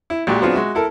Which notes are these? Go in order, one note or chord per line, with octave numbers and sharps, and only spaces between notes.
E4
A#1 A#2 G#3 F#4 G4
F#3 B3 C4 D4 F4 G#4
G#3 F#4 E5
E4 A4 A#4